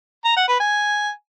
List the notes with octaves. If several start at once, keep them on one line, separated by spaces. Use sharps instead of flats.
A#5
F#5
B4
G#5